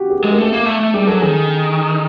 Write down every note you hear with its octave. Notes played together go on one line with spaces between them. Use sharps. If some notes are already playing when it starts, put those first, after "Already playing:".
Already playing: F#4 G4
G#4
G#3 A4
A#4
A3 A4
A#3
A3
A3
G3 G#4
F#3 A4
D#3 G#4